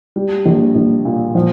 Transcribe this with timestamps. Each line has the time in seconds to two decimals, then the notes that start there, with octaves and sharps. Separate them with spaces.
0.16 G3
0.46 A#1
0.75 A#1
1.05 A#2
1.35 F3